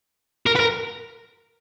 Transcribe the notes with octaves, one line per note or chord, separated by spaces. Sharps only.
A#4
B4
A#4